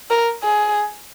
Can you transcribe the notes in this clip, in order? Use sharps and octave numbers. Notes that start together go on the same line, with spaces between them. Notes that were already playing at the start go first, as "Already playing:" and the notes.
A#4
G#4